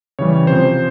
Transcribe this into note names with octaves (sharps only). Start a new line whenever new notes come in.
C#3 E3 G3 C#5
C3 F3 C5